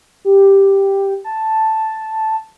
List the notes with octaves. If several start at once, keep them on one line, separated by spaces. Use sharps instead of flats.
G4
A5